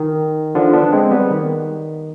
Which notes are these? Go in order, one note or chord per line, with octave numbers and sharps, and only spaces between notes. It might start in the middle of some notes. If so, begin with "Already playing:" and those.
Already playing: D#3
D3 F3
B3 D4
G#3 C4
G3 B3
D#3